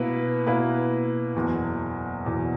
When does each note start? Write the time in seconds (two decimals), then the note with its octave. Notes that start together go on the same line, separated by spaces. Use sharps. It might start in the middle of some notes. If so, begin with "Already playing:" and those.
Already playing: B2 A#3 E4 B4
0.46 B2 A#3 E4 B4
1.35 F#1 E2 B2
2.25 F#1 E2 B2